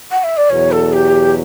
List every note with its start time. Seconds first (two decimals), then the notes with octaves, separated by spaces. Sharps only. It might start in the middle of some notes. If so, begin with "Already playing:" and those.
0.11 F#5
0.23 E5
0.37 D5
0.49 E2 B2 F#3 C#5
0.71 A4
0.92 G4